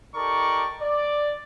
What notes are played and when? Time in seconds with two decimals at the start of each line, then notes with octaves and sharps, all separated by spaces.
0.15 D#4 G4 A4 A#4 D5 C#6
0.81 D5